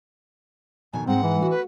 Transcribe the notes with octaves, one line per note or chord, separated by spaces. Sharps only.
F2 B2 D#3 G#5
G#2 G#3 C4 F#5
E3
A3 F#4
B4